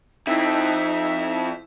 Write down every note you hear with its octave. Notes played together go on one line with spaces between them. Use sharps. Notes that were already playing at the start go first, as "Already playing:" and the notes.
F2 C4 D#4 E4 E5 E6 B6